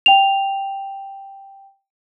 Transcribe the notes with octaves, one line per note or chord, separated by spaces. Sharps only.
G5 F7